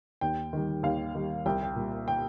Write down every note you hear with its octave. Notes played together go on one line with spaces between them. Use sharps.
D#2 G5
D#3 G3
D#2 F5
D#3 G3
C2 G5
G5
A#2 G3
G5